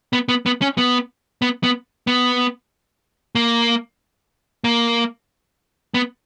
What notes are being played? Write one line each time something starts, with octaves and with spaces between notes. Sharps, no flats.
B3
B3
B3
C#4
B3
B3
B3
B3
A#3
A#3
B3